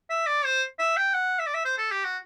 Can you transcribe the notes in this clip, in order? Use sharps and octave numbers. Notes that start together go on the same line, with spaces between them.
E5
D5
C5
E5
G5
F#5
E5
D5
E5
C5
A4
G4
F#4